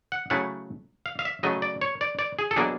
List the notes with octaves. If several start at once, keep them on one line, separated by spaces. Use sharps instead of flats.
F#5
C#3 F#3 A3 C#4 E4 F#5
F5
F5
E5
C#3 F#3 A3 D#5
D5
C#5
D5
D5
G#4
A4
B2 F#3 A#3 D4 G#4